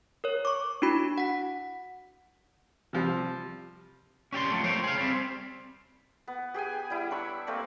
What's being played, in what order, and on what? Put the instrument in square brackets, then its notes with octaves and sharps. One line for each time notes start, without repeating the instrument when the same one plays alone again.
[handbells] A#4 C#5
C#6 D6
D4 E4 F#4 B5
F#5 B6
[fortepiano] C3 F3 G3
[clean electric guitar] C#4 G4 D5 C6
F3 A3
C5 C#5 G5
G#4 F5
G3 C4
[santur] B3
G4 G#4 G5 G#5
G3 E4
D4 B5 C#6 E6
A3 A#3 C4 D5